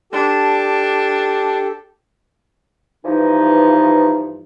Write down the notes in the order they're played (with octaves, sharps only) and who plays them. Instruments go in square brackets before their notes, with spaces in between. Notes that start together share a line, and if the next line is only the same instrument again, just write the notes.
[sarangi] D4 [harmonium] G4 A4
[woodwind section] G2 E3 F3 D#4